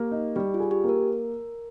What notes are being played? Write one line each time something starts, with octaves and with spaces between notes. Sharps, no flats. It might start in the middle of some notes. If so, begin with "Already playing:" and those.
Already playing: A#3 G4
D#4
G3 G4
F4
G#4
G4
A#3
A#4